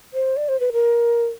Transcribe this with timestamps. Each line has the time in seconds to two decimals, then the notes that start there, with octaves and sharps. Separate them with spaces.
0.13 C5
0.37 D5
0.49 C5
0.60 B4
0.73 A#4